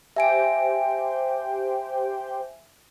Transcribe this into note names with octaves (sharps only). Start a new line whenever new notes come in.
G4 C5 E5 G5 G#5 D7